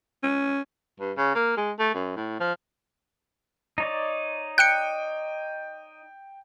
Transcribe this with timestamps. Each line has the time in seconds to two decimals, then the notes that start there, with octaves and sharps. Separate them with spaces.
0.23 C#4
1.00 G2
1.17 C#3
1.35 A#3
1.57 G#3
1.79 A3
1.94 F#2
2.16 A2
2.40 F3
3.78 D#4 C#5 D5
4.58 G5 F#6 G6 C#7 D7